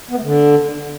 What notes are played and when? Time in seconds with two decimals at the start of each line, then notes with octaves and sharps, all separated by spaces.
0.10 B3
0.17 A3
0.23 D3